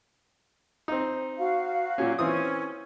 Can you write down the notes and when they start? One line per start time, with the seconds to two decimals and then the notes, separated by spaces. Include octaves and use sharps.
0.88 C4 D#4
1.38 F#4 F5
1.98 A#2 F#3 C#4
2.19 E3 C4 C#4 D#6